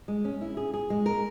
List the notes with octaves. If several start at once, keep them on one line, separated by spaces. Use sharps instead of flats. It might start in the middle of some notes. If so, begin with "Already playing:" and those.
G#3
C#4
E4
G#4
G#4
G#3
A#4